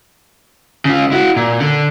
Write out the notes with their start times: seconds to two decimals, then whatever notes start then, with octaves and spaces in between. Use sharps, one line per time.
0.85 C#3 F4
1.12 E4 F#4
1.36 A#2
1.60 D3